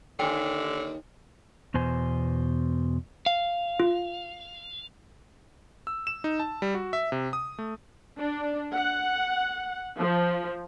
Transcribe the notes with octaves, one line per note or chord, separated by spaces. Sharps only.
D#2 D3 G5 G#5
E2 B2 C5 G#5
F5
F4
E6
E7
D#4
A5
G3
F#4
E5
C3
D#6
A3
D4
F#5
F3